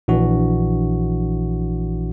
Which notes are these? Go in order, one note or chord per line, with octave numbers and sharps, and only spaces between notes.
A#1 E3 D4 F#4